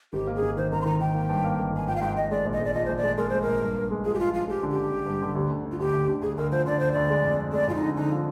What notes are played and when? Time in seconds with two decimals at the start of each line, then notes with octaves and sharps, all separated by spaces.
0.13 G#1 G4
0.27 A#3
0.35 G#4
0.42 G#1
0.57 D#3 C5
0.72 G#1 A#5
0.81 C6
0.86 D#3 A#5
1.00 D#3 G5
1.14 A#3
1.29 G2
1.44 A#3
1.59 G#1
1.73 G#1 G#5
1.87 F3 G5
1.96 F5
2.01 G#2 G5
2.16 G#2 D#5
2.31 G#3 D5
2.45 A#1
2.53 D#5
2.60 G#3 D5
2.74 F3 D#5
2.85 A#1 C5
2.97 D5
3.03 G#3
3.18 G#3 A#4
3.29 G#3 C5
3.42 A#4
3.47 A#1
3.61 G2
3.77 G2
3.91 G#3
4.05 F3 G#4
4.14 G4
4.19 F3 F4
4.34 F3 F4
4.48 G#3 G4
4.63 D3
4.71 G4
4.77 D3
4.92 D3
5.06 G2
5.22 D3
5.35 D2
5.51 D3
5.65 D3
5.72 F4
5.79 D2 G4
5.94 D2
6.08 D3
6.22 D2 G#4
6.37 D2 A#4
6.52 F3 C5
6.66 D3 D5
6.80 D2 C5
6.92 D2 D5
7.10 G#3
7.24 F2
7.39 F2
7.53 G#3 D5
7.68 F2 F4
7.75 D#4
7.83 D3
7.96 D3 D#4
8.11 F3